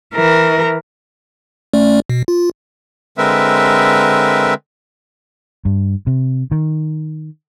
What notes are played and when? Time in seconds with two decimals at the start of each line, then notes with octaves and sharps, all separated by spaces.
0.14 E3 A#4
1.73 A3 C#4 D5
2.10 B2
2.28 F4
3.18 D3 G#3 C4 A#4 B4 E5
5.65 G2
6.07 C3
6.51 D#3